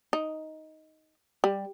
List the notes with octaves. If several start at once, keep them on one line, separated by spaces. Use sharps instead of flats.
D#4
G3